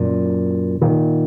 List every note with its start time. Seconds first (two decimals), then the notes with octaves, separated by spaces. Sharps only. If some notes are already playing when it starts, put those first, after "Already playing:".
Already playing: F#2 A#2
0.81 A#2 D#3